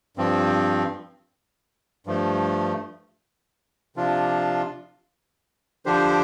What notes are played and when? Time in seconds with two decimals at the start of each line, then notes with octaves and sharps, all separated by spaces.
0.17 G2 F3 C4
2.07 G2 F3 A3
3.96 C3 F3 D4 F4
5.86 D3 F3 D4 G4 C5